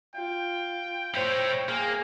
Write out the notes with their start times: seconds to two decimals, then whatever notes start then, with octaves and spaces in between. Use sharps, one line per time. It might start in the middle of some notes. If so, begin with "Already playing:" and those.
0.16 F4 G5
1.14 E4 C5 C#5
1.69 A#3 G#4